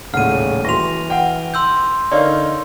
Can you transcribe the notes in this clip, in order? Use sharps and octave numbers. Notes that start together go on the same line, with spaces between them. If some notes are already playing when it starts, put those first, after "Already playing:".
D#1 A2 C#3 F#5 F6 D#7
E3 F#4 G#4 C#6 A#6 F7
B4 F#5 G5
C6 E6 G6
D3 D#4 A#4 B4 C#5 D5 F5